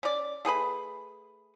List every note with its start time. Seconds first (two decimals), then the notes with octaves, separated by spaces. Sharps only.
0.03 C#4 D5
0.45 A3 G#4 B4 B5